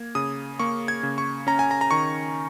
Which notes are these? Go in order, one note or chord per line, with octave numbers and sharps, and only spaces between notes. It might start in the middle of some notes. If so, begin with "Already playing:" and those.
Already playing: A#3 G#6
C#3 D#6
A#3 C#6
G#6
C#3
C#6
C#4 A#5
G#5
A#5
A#5
D#3 C#6